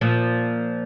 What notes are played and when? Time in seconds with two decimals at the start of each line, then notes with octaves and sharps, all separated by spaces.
0.01 A#2 F3